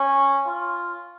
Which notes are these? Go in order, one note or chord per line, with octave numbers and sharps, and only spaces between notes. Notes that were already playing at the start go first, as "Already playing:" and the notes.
Already playing: C#4
F4